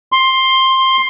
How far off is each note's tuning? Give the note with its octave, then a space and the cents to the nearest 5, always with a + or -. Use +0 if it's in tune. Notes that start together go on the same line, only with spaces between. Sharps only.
C6 +10